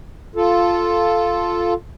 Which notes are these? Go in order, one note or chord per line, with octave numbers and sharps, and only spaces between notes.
F4 A4